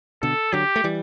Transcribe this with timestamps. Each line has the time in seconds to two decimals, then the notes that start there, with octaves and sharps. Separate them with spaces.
0.22 B2 D3 A4
0.53 D3 F#3 G4
0.76 A3
0.84 E3 G3